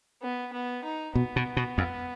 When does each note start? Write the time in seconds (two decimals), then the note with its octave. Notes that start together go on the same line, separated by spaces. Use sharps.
0.22 B3
0.53 B3
0.84 D#4
1.15 B2 B3
1.36 B2
1.57 B2
1.78 F2